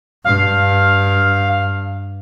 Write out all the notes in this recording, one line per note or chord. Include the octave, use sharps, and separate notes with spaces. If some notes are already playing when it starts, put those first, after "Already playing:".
G2 F5